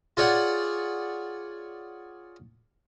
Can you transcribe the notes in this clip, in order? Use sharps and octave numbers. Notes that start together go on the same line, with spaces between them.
F4 G#4 C#5 D5 F#5